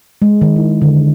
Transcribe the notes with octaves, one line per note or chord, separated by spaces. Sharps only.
G#3
D#3
E4
D3